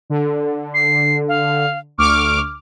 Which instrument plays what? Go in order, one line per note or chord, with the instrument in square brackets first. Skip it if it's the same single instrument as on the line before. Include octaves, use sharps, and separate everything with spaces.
[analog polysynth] D3
[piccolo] C7
F5
[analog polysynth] D2 D6 F6 [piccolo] C#6